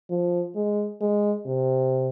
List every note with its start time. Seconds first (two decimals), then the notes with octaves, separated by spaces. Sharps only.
0.10 F3
0.56 G#3
1.01 G#3
1.46 C3